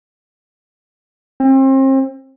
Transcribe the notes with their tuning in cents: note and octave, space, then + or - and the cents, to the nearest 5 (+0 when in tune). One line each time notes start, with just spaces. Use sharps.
C4 +35